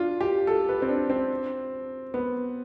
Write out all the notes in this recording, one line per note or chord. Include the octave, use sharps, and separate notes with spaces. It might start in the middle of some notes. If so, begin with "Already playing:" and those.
Already playing: D4 F4
G4
A4
B4
C4
D4
C4
B3